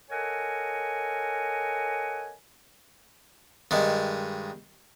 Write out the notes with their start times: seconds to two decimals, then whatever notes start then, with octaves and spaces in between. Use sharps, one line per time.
0.10 A4 A#4 C#5 D#5 F#5 G#5
3.71 G2 D#3 G#3